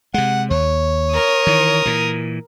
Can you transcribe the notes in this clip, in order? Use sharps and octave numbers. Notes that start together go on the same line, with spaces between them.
C3 G#3 F#5
D#2 C#5
A#4 D#6
D#3 E3
A#2 E3